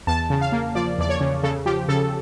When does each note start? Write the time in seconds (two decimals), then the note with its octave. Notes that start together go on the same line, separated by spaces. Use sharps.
0.07 E2 A5
0.30 C#3
0.41 F5
0.52 A#3
0.75 F3 D5
0.98 E2 D5
1.09 C#5
1.20 C#3
1.43 C#3 A4
1.66 F3 G4
1.88 C#3 A4